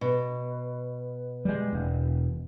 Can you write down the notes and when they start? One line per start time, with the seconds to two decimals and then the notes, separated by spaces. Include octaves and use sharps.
0.01 B2
1.45 G3 G#3
1.73 E1